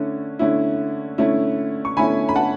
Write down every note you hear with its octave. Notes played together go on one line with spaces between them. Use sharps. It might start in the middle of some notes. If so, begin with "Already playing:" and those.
Already playing: D3 A3 C#4 E4
D3 A3 C#4 E4
D3 A3 C#4 E4
C#6
D3 A3 C#4 E4 G#5 B5
B5
F#5 A5